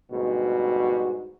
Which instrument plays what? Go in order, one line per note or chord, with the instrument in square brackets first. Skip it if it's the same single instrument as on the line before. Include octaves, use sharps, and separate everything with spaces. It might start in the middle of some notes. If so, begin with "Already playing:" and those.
[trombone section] D2 G#2 B2 G3 F#4